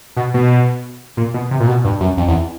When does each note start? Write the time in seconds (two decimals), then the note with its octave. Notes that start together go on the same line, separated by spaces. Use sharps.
0.16 B2
0.34 B2
1.17 A#2
1.34 B2
1.51 C3
1.60 A#2
1.67 B2
1.84 G2
2.00 F#2
2.17 F2
2.28 E2